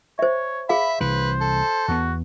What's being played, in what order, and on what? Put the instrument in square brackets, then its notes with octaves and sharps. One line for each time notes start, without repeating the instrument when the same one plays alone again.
[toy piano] C5 E5 [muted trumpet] C#5
[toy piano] G#4 F5 [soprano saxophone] E5 [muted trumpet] B5
[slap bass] C2 E3 [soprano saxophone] B4 [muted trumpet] C5
[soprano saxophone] A4
[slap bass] E2 B3 [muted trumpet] F#4